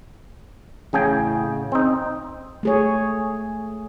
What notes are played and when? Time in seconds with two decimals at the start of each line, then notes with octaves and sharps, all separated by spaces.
0.93 A1 A2 C#3 G#4 G5
1.72 C4 D#4
2.63 A3 G#4 C#5